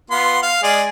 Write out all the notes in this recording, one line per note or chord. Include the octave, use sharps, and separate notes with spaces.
B3 F4 C6
F5
G#3 G#4 D5